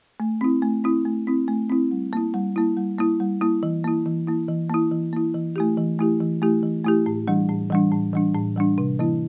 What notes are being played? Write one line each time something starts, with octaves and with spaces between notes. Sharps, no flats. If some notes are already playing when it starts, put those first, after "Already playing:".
A3
C4 E4
A3
C4 E4
A3
C4 E4
A3
C4 E4
G3
A#3 E4
G3
A#3 E4
G3
A#3 E4
G3
A#3 E4
E3
A#3 E4
E3
A#3 E4
E3
A#3 E4
E3
A#3 E4
E3
A3 E4 G4
E3
A3 E4 G4
E3
A3 E4 G4
E3
A3 E4 G4
A2
E3 G3 D4
A2
E3 G3 D4
A2
E3 G3 D4
A2
E3 G3 D4
C3
E3 A#3 E4